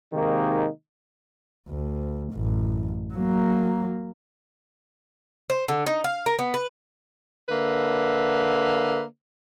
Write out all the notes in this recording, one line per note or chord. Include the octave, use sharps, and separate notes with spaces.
C3 D#3 G#3 A#3 D#4
D2
A1 F#2
F#3 A#3
C5
D3
D#4
F5
A#4
B3
B4
D3 A#3 B4 E5